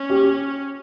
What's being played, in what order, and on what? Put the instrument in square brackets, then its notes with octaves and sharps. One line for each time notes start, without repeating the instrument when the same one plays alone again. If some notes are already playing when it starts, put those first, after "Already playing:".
Already playing: [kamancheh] C#4
[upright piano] G4